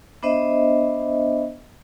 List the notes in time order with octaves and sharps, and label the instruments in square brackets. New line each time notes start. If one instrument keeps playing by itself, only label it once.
[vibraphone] B3 D4 C5 D#5 E5